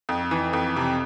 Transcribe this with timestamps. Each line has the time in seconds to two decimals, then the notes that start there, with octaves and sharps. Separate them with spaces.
0.09 F2
0.31 E3
0.53 F2
0.76 C3